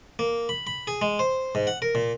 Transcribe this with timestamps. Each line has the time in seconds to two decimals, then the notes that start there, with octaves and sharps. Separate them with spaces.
0.19 A#3
0.49 B5
0.67 B5
0.87 G#4
1.02 G#3
1.19 C5
1.55 G#2
1.67 F#5
1.82 A#4
1.95 A#2